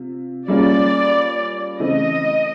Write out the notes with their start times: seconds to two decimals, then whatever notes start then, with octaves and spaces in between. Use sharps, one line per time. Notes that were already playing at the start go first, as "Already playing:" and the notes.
Already playing: C3 F4
0.48 G3 A#3 C#4 F4 G#4 D5
1.80 C#3 E3 A3 C4 D#5